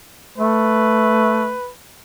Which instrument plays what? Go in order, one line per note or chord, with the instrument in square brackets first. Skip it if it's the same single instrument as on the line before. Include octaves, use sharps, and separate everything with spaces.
[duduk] A3 [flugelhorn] B4